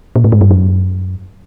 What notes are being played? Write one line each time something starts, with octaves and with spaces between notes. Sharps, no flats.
A#2
A2
G#2
G2
F#2